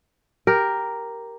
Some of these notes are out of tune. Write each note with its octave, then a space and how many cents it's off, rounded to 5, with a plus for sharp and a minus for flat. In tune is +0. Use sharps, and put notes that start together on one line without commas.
G4 +0 A#4 +0